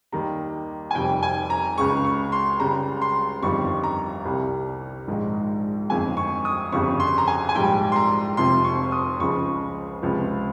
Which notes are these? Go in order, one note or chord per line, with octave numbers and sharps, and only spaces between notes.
D#2 D#3 G3 A#5
G#5
F1 F2 D#3 G3 G5
G#5
A#5
C#2 C#3 G#3 C#6
C#6
C6
C#2 C#3 G3 A#5
C6
G1 F2 D#3 G3 C#6
A#5
C2 C3 G3
A#1 G#2 D#3 G#3
G1 F2 D#3 G#3 G#5
C#6
D#6
G1 F2 C#3 G3 C#6
C6
A#5
G#5
G#5
A#1 G#2 G3 G5
C6
A#5
F1 F2 C3 F3 C6
C#6
D#6
C#2 C#3 F3 G#3 C#6
C#2 C3 F3 G#3